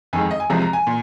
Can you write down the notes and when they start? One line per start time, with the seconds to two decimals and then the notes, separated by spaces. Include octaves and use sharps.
0.13 F2 D#3 G#3 G#5
0.31 D#5
0.40 G#5
0.50 C2 C3 F3 G#3 A#5
0.62 A#5
0.73 G#5
0.87 A#2